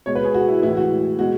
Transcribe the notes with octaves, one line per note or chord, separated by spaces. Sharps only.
B2 G#3 C#5
B4
G#4
F#4
E4
A2 E3 G#3 E4
F#4
B2 G#3 F#4